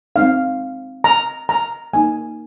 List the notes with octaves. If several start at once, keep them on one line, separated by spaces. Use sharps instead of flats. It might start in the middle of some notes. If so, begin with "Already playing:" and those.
G#3 C4 D#4 F5
A#5
A#5
A#3 D#4 G#5